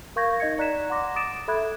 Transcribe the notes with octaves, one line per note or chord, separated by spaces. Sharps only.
A#4 F5 C#6 G6 G#6 A#6
D#4 D#5 G#6 C#7
D5 A#5 F#6 G#6 B6 E7
F#5 A#5 C6 D6 A#6
D6 D#6 A6 D7 E7
A4 E5 B5 F#6 G#6